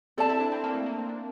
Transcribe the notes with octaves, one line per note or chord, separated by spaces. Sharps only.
C4 A4 D5 A5
E4
D4
C4
A#3
A3
A#3
C4
D4